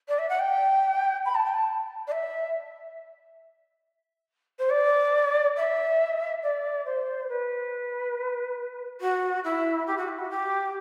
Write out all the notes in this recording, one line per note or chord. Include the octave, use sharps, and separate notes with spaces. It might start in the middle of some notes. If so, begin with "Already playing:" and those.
D5
E5
F#5
G5
B5
A5
G5
A5
D5
E5
C5
D5
E5
D5
C5
B4
F#4
E4
G4
F#4
E4
F#4
G4